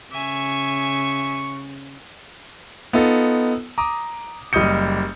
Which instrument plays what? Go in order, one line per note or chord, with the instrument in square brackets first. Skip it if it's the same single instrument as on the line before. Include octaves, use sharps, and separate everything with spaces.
[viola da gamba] C#3 [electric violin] E5 G#5 [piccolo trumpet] C#6
[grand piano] B3 D#4 F4 A4
A#5 D6 D#6
F#1 G3 D#5 D#6 G6 C#7